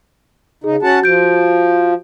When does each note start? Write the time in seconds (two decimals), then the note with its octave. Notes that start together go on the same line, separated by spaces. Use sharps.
0.64 C#3 D#4 G#4
0.83 C#4 F#4 F#5 A5 A6
1.02 F3 F#4 G6 D7